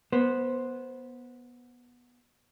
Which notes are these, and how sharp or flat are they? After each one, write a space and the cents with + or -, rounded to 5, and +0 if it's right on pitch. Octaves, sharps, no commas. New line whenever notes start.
B3 -15 C5 +0